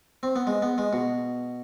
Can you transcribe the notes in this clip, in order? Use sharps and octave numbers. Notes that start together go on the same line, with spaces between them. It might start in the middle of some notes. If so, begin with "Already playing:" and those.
C4
B3
G#3
B3
G#3
B2